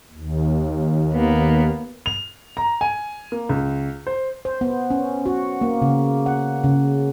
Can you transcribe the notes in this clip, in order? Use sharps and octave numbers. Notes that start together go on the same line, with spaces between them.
D#2
A#3 B3
F7
A#5
G#5
A#3
C#2
C5
C5
B3
C#4
F#4
A#3
C#3
F#5
C#3